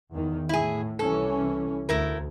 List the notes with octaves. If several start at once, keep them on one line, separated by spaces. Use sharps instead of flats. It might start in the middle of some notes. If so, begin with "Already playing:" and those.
E2 D#3
A2 E4 G#4
C2 E3 C#4 A4
D2 A3 E4 A#4